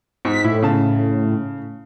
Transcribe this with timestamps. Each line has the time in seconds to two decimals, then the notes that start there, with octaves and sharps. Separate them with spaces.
0.25 G#2 B6
0.44 A2 E4
0.62 C#3 A5